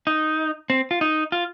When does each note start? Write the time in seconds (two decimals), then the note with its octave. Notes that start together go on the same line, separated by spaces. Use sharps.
0.07 D#4
0.70 C4
0.91 F4
1.01 D#4
1.32 F4